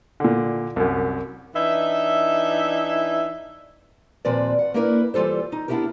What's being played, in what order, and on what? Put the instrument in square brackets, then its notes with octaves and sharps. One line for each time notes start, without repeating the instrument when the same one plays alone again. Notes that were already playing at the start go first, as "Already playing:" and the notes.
[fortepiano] A#2 D3
C2 F#2
[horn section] E3 D4 D#4 E5
[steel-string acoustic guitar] D#2 A#2 F3 C4 B4 D5
F#5
A#3 C#4 D4 E4 A#4 B4
E3 G3 F4 A4 C5
D#4
B3 D4 E4 F#4 G4 A#4